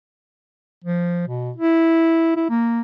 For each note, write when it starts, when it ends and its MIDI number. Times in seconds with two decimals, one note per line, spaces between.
0.84 1.24 53
1.28 1.51 47
1.56 2.32 64
2.36 2.49 64
2.49 2.82 58